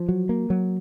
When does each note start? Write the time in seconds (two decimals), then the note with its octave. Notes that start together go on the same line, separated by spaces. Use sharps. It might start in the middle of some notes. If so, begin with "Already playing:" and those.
Already playing: F3
0.09 F#3
0.29 A#3
0.50 F#3